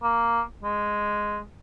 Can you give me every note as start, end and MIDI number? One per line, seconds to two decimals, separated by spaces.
0.03 0.41 58
0.63 1.39 56